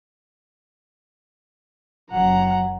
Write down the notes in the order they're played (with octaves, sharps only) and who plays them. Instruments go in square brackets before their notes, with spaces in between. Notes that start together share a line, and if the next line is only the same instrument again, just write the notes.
[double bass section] F#1 F#3 [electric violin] F#5 A#5